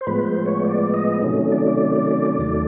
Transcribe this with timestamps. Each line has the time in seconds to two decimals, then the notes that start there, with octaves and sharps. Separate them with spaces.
0.01 C5
0.07 A2 F3 G#3 B3 B4
0.26 C5
0.46 C#5
0.65 D5
0.94 D#5
1.23 C3 D#3 F#3 A3 C#4
1.52 D5
2.39 D#2 D#3 F#3 A3